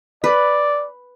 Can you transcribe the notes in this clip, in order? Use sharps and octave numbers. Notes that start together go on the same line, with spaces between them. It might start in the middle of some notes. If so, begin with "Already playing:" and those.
B4 D5